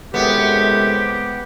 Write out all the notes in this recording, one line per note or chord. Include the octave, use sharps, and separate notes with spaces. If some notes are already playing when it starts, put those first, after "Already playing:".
F#2 A2 C3 G#3 B3 G4